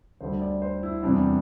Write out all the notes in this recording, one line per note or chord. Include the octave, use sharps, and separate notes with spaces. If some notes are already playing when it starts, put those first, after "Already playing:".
D2 D3 G3 C5
D5
C5
E4
E2 C3 G3 D4